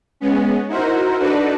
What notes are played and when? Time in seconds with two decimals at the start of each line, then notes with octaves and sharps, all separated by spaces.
0.20 G#3 B3 C#4
0.68 D#4 E4 F#4 A#4 C5
1.19 D4 D#4 F#4 A4 B4 D5